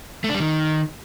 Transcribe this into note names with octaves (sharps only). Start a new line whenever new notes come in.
A3
D4
G3
D#3